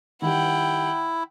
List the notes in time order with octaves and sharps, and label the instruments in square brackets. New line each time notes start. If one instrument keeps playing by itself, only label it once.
[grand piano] D#3 G3 [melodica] E4 [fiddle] F#5 G5